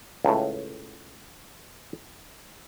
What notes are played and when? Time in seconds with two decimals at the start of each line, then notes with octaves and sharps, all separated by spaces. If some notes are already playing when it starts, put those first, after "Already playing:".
0.25 C#2 A2